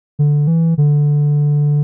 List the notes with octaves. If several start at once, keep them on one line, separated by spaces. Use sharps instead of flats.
D3
E3
D3